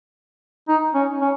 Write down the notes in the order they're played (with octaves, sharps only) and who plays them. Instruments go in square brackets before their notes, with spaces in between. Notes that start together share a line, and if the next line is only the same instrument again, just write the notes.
[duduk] D#4
C#4
C#4